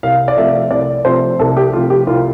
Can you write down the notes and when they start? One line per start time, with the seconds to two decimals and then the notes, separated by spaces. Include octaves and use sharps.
0.03 C2 F5
0.28 D5
0.36 C3 F3 A3 E5
0.70 C2 D5
1.05 C3 F3 A3 C5
1.39 C2 A4
1.57 G4
1.73 C3 F3 A3 F4
1.90 G4
2.07 C2 F4